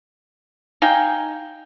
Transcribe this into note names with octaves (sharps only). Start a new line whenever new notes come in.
D#4 F5 G5 G#5